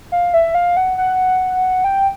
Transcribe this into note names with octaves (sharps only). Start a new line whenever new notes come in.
F5
E5
F5
F#5
F#5
G5